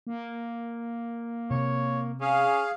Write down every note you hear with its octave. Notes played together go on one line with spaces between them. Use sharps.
A#3
C3 C#5
C#4 G#4 F5